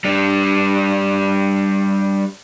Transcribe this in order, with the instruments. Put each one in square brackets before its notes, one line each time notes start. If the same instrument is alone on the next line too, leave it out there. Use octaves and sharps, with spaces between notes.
[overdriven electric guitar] G3 D4